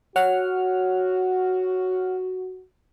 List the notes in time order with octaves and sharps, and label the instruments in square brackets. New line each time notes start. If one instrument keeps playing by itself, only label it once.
[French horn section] F#4 [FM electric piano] C#5 F#5 F6